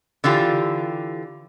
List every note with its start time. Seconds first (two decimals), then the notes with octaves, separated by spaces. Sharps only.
0.24 D3 E3 F4 G4